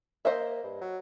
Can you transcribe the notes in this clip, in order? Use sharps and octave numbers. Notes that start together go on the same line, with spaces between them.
A#3 C5 D#5 E5
G2
F#3